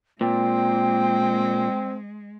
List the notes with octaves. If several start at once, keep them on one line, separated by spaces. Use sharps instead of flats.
A#2 G#3 C4 G5